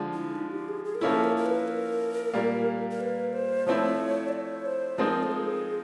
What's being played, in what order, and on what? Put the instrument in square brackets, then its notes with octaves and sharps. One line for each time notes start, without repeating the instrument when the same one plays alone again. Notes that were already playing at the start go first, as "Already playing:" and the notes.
Already playing: [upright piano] D3 F3 G#3
[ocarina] E4
D#4
G4
G#4
G#4
A#4
[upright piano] F3 A#3 C#4 E4 [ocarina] A4
[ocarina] A#4
A#4
B4
A#4
[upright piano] A#2 G3 A#3
[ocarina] A#4
B4
C5
[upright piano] F3 A3 C4 E4 [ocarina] C#5
[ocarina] D5
C#5
C5
[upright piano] F3 G#3 C4 D#4 [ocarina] A#4
[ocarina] A4
G#4